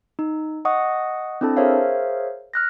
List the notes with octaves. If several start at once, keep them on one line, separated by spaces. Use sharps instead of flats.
D#4
D#5 F#5 C#6 D#6
C4 D4 E4 A4 A5
G#4 A#4 C5 C#5 E5 F5
F6 F#6 A#6